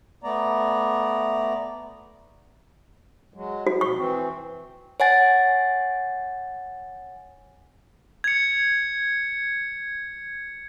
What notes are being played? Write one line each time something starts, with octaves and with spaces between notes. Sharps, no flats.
A3 B3 D5 A#5
F#3 G#3
F#4
B2 C#6
E3 C4
C#5 F#5 G#5 A6
G#6 C#7